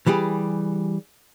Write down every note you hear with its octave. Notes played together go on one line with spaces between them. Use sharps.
E3 G3 G4 G#4